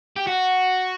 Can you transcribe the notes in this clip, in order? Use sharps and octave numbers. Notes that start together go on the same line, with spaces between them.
G4
F#4